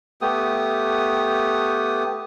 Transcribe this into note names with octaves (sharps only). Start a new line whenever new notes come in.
A3 B3 G4 D#6